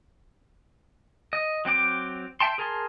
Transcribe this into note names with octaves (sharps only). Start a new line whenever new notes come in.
D#5
F#3 C4 G5 D6
E5 G5 A5 C6
G#4 A#4 G#5 A5 C6